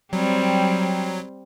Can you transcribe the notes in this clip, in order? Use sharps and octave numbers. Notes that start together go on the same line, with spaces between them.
F#3 G3 C4